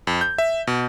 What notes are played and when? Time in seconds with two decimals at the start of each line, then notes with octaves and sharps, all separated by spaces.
0.07 F2
0.21 G6
0.38 E5
0.67 B2